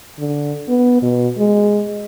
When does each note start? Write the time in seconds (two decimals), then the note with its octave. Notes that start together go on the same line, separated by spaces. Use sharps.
0.19 D3
0.68 B3
1.02 B2
1.38 G#3